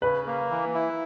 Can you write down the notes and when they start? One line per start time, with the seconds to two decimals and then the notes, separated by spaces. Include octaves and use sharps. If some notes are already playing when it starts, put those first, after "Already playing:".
0.02 C#3 B4
0.27 A#3
0.50 E3
0.74 E4